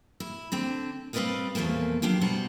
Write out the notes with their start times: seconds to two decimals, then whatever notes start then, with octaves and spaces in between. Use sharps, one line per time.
0.20 E4
0.52 D3 C4 D4
1.13 G3 C4 B4 D5 D#5 F5
1.55 E2 A#2 F3 A3 A#3
2.02 F#3 D4 F4 G4
2.21 D2 B2 G3 C5 F#5 A#5